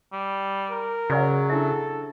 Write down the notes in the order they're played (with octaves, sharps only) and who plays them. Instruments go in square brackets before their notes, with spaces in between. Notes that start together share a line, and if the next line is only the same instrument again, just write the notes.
[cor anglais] G3
[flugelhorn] A#4
[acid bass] C#3 [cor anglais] F#3 [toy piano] F#4 D5 F#5
[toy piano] D4 E4 E5 [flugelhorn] A4